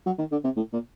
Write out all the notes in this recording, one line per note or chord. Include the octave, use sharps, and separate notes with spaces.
F#3
D#3
D3
C3
A2
A#2